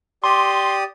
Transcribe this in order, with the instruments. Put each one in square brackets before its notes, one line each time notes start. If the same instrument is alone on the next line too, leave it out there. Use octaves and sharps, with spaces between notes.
[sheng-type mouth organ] G4 D5 D#6 [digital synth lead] C6